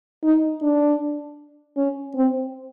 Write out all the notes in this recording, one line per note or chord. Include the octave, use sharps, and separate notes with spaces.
D#4
D4
C#4
C4